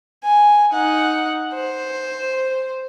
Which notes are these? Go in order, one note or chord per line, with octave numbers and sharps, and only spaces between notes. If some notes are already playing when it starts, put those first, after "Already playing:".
G#5
D#4 F#5
C5